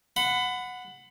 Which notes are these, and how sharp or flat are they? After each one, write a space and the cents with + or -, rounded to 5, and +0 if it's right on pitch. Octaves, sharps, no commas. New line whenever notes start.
F#5 -10 B5 +25